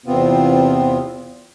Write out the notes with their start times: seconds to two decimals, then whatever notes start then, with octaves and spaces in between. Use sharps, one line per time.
0.06 E2 C3 B3 C4 F4